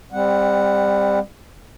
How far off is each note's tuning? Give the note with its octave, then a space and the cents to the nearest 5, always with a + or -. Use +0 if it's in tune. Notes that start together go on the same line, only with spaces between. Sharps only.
G3 +25 C4 +5 F#5 +0